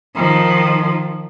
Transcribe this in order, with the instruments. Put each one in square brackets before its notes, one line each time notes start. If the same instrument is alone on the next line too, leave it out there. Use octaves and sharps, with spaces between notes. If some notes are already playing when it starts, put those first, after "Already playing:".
[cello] D#3 F3